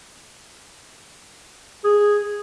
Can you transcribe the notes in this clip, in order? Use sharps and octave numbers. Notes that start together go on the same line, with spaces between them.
G#4